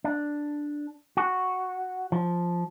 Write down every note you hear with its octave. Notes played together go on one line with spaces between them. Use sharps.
D4
F#4
F3